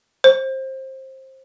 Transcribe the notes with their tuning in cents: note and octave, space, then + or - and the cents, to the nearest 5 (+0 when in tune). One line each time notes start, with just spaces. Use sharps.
C5 +20